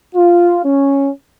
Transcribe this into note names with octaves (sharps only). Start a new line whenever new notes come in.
F4
C#4